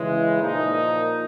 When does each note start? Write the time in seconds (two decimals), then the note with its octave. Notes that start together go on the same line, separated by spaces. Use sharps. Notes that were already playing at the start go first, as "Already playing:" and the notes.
Already playing: C#3 E3 G#3
0.40 A#2 F3 A#3 D#4